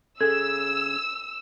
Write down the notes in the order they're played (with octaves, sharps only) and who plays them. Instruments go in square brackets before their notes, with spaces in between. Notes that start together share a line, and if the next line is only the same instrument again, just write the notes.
[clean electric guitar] C#3 G#4 [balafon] A4 [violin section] E6 [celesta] G#6